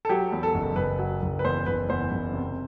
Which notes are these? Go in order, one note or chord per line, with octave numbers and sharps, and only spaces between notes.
A4
F#3 G4
E2
A4
F#1
F#1 B4
F#3
F#1
B4
E2 C5
F#1 B4
E2 C5
F#1
C3